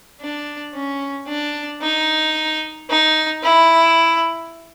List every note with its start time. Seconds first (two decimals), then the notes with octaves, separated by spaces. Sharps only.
0.21 D4
0.74 C#4
1.28 D4
1.82 D#4
2.90 D#4
3.43 E4